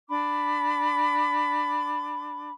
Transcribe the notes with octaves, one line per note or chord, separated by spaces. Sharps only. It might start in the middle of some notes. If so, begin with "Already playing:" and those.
D4 B5 D6